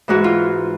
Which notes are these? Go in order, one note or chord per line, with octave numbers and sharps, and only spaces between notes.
G#2 E3 G#3 F#4
F4